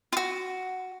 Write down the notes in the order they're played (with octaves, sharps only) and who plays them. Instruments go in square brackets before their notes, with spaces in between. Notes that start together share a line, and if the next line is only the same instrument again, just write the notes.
[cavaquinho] F4 F#4